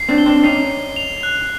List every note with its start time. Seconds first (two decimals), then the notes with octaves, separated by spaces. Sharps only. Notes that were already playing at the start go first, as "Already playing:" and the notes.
Already playing: C7
0.09 C4 D4
0.18 G7
0.26 C4 D4
0.44 C#4 D#4 C7
0.70 C7
0.96 F7
1.23 F#6